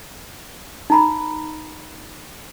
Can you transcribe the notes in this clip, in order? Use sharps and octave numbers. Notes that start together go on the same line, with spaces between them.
D#4 A#5 B5